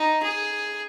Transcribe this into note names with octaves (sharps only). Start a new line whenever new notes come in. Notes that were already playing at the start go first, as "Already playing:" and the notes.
Already playing: D#4
G#4